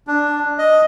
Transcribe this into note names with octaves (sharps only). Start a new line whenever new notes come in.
D4
D#5